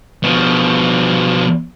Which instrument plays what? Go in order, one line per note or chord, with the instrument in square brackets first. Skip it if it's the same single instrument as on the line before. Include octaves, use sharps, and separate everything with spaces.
[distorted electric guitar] B2 F3